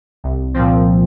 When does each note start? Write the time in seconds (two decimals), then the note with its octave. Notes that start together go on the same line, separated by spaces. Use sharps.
0.24 C2
0.54 A#2 F3 C4